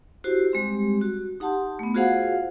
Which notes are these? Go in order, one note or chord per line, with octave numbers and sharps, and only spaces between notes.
E4 F#4 G4 C5
G3 G#3 C4 G4
F#4
D#4 G4 F#5 A5 C6
A3 B3
F4 F#4 G#4 C5 F5 F#5